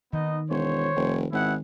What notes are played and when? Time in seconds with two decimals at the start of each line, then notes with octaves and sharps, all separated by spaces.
0.13 D#3 B3 D#4 D#5
0.50 E1 C5 C#5
0.96 F1
1.32 G#1 B3 E4 F#5